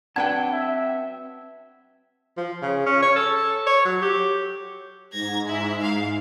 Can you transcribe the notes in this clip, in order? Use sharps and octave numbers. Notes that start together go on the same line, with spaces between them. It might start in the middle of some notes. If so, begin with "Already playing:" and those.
F#3 C4 D4 B4 F#5 G5 A5 G#6
E5
F3
C#3
C#4
C#5
A4
C#5
F#3
G4
G#2 G#6 A#6
E4
F5